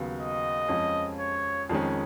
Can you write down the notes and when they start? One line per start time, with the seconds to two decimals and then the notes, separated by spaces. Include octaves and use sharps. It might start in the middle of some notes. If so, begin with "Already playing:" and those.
Already playing: D#2 C#3 F#3 B3
0.19 D#5
0.69 F2 F3 G#3 C#4
1.20 C#5
1.69 F2 D#3 G#3 C#4